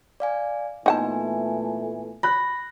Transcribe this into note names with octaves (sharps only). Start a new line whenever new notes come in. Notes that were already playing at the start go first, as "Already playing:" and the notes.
D5 F5 G#5
A#2 E3 A3 B3 D#4 F#5 G#5 A5
B5 F#6 A#6